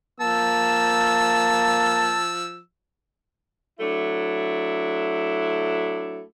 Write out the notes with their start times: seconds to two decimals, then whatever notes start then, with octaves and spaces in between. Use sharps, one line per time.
0.20 F3 A#3 A5 E6
3.80 F#3 A3 D4 E4